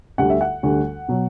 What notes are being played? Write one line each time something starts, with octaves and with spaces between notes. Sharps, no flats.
D2 D3 G3 F#5
E5
F#5
D2 D3 G3
B2 F#3